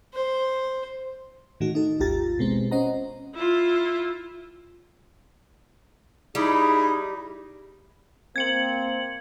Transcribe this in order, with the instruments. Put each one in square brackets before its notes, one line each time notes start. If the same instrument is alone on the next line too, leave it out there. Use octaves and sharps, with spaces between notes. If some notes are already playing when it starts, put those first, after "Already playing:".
[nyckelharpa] C5
[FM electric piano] A2 D#3 A3 F#4
D#4 A4
G#1 D#2 F4 G4 A#5 A6
B2 G#3 C4
C#4 C5 D#5 F#5 A#5
[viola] E4 F4
[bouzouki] G3 [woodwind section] D#4 E4 G#4
[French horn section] A#3 C4 [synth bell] G#6 C#7 F#7